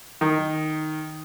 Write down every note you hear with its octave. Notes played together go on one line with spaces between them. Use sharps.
D#3